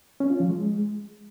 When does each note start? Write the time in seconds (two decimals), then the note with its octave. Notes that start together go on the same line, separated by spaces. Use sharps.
0.20 C#4
0.30 F4
0.40 F3
0.50 G#3